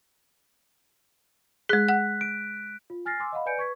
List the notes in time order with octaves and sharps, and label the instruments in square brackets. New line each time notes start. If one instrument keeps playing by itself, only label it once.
[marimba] G#3 G#4 [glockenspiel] F#6 B6
[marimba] F#5
[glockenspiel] D7
[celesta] F4
G#5 F6 A6 A#6 C7
G#5 C6 D6 E6
D#5 F5 F#5 B5
B4 D5 G#5 G6 C#7 D7
B4 C#6 G#6 B6